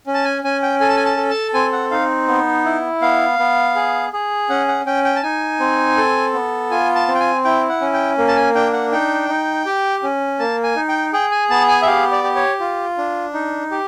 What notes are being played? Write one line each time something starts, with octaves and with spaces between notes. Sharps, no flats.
C#4
A5
G#5
C#4 G#5
G5
A4 G#5
A5
G#5
A5
A4
A5
C4 G#5
F#5
D#4 F5
B3
E4
B3 F5
B3
G#4
G#4
C#4 F#5
F#5
C#4 G5
G5
A5
D#4 G#5
C4
A4
B3
F4 G#5
A5
C4
G5
G#5
E4 G5
F#5
C#4
G5
A#3
A5
G#5
D4 G5
F#5
D#4 G5
D#4
G4
C#4
A#3 A5
G#5
D#4
G5
G#4 G5
G#5
B3 A5
G#5
E5
G4 F5
D5
G4
C#5
F4
D4
D#4
G4